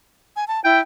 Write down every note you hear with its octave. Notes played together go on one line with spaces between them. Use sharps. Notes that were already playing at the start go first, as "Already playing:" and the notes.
G#5
A5
E4 G5